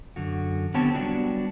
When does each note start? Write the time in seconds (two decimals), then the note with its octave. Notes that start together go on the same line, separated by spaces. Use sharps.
0.16 F#2 D3 F#4
0.74 D3 B3 C4 G4 C#5 A5
0.94 F#3 G3 B3 D4 D#4 F#4